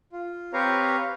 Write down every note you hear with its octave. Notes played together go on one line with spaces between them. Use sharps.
F4
C4 G4 B4 C#5 F5 A#5